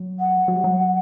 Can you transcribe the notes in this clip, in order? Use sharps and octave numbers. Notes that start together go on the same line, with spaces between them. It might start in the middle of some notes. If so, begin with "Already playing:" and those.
Already playing: F#3
F#5
F#3
G3
F#3